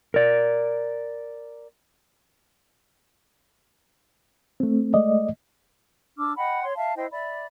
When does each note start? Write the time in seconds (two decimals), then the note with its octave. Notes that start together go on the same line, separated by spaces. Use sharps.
0.14 A#4 D5
4.60 A3 C4
4.94 G#3 A3 D5 D#5
6.17 D4 D6 E6 F6
6.36 D#5 F#5 G5 B5
6.63 C#5 C6
6.75 E5 F5 A5
6.96 E4 C5 D#5 G5
7.11 D5 E5 B5